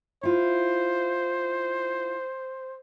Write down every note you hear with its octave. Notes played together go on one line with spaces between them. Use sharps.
E4 F4 C5